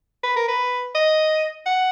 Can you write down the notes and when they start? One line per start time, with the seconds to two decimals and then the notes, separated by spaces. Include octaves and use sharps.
0.23 B4
0.36 A#4
0.48 B4
0.95 D#5
1.66 F#5